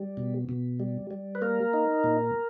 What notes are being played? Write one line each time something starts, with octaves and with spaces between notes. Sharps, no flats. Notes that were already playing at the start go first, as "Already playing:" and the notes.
Already playing: G3
B2
B2
G3
G3
B4
A#3 A#4
D#4
A#2